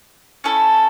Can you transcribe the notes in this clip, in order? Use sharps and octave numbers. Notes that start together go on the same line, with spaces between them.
A3 C#4 E4 A4